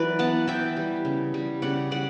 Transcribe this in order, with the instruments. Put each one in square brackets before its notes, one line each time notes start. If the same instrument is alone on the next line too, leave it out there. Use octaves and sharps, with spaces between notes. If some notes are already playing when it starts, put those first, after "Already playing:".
Already playing: [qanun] E3 F#3 B4 D5
B3 F#5 A5
E3 E5 G5
G3
C#3
G3
C#3 D5 F#5
G3 D5 F#5